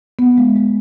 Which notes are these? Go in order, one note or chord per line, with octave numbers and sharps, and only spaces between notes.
B3
G#3
G#3